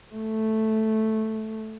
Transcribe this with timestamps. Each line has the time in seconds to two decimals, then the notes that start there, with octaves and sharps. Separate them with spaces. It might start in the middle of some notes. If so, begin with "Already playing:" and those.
0.15 A3